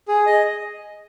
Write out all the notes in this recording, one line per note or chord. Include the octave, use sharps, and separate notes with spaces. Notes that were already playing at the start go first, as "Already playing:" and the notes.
G#4
D#5